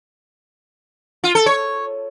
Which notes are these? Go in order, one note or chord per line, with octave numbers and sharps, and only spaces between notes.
F4
A4
C#5